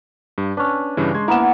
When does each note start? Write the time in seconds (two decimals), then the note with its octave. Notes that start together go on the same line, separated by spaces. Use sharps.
0.38 G2
0.57 C#4 D4 B4
0.97 G2 C#3 E3
1.15 G#3 C6 G#6
1.28 A#3 B3 E4 E7